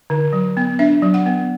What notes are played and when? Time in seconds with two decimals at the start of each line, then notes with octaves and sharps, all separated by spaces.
0.10 D3
0.33 F#3
0.57 B3
0.79 D4 E5
1.02 F#3
1.14 F#5
1.26 B3